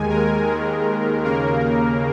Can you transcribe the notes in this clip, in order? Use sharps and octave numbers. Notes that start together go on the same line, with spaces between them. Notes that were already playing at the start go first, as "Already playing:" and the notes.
Already playing: D#2 D#3 G#3 G#5
A#4
D#2 D#3 G#3
D#2 C#3 A#3 A#4